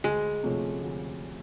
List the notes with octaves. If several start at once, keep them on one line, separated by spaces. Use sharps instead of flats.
D2 G#3
C3 F3 A3 C#4
D2